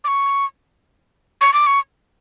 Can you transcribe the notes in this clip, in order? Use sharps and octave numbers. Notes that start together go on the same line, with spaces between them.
D6
C#6
C#6
D6
C#6